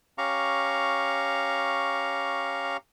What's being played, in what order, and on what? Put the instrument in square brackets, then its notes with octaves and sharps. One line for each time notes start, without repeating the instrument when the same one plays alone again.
[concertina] C#4 G4 F5 A#5 C#6